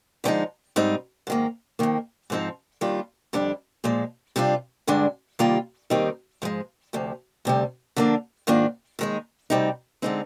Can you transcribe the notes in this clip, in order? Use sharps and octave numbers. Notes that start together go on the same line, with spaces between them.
D3 F3 G#3 C4 D#4
G#2 G3 C4 D#4
G#2 D#3 A#3
F2 D#3 A#3
G#2 F3 C4 D#4
D#2 D#3 G3 D4 F4
F2 D3 G3 D4
A#2 F3 G#3
C3 G3 D4 F4
G2 D3 G#3 D4
C3 D#3 G3 A#3 F4
D#2 D#3 G3 C4 D#4
G#2 F3 G#3
D2 C3 F3
D2 C3 G3
D3 F3 A#3 D4
G#2 D#3 A#3 D4 F4
D#2 D#3 G#3 D#4
D2 C3 G3 C4 D#4
D3 G#3 C4 D#4